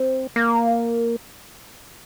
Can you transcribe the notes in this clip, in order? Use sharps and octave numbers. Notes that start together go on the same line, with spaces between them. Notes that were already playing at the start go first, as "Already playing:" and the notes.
Already playing: C4
A#3